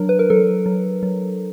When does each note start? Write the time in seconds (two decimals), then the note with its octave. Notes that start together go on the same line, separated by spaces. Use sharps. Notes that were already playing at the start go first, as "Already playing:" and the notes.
Already playing: F#3 D4 A#4
0.09 B4
0.19 A#4
0.30 F#3 A4
0.66 F#3
1.03 F#3